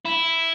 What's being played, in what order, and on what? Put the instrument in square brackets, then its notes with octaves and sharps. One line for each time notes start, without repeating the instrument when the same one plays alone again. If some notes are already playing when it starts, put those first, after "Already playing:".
[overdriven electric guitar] E4